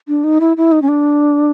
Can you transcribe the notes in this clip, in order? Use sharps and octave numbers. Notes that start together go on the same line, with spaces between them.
D4
D#4
E4
E4
D#4
C#4
D4